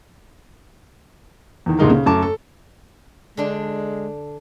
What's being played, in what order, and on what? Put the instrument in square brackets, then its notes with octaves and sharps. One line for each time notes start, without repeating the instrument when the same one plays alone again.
[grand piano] E2 D#3
D2 A#2 G#3 D#4 A#4
C#3
F#2 A3 A5 D6
A4
[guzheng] D3 D4 [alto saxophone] G#3